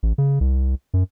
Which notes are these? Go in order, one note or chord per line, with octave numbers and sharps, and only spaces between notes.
A1
C#3
C2
F#2